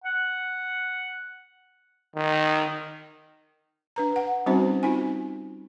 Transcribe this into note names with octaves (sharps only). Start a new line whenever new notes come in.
F#5
D#3
D4 B4 A#5
F#5
G3 C4 C#4 D#4 F#4 C5
C4 D#4 F4 G#5